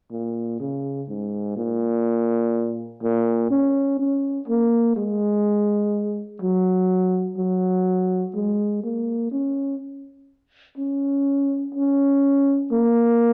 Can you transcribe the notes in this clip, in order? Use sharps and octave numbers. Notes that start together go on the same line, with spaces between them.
A#2
C#3
G#2
A#2
A#2
C#4
C#4
A#3
G#3
F#3
F#3
G#3
A#3
C#4
C#4
C#4
A#3